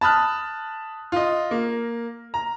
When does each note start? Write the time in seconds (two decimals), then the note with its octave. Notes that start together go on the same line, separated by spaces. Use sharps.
0.01 A5 B5 D#6 F6 F#6
1.12 F4 D#5
1.51 A#3
2.34 A#5